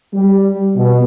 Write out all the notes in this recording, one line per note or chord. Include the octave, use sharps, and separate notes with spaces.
G3
B2